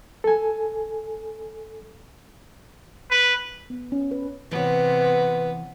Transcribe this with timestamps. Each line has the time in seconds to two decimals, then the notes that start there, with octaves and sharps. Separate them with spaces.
0.24 A4 G#5
3.10 B4
3.70 B3
3.92 C#4
4.11 B4
4.51 C3 E3 B3 B4 C#5